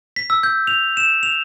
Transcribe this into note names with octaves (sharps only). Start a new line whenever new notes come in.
B6
E6
G6
F7
E7
F7